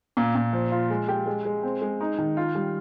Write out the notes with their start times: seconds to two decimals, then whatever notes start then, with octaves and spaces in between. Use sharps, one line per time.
0.17 A#2
0.35 A#2
0.53 F3
0.72 F4
0.90 G#3
1.08 G4
1.26 G#3
1.45 G#3
1.63 C4
1.82 G#3
2.01 D#4
2.18 D#3
2.37 F4
2.55 G3